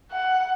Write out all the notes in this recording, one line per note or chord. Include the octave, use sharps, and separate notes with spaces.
F#5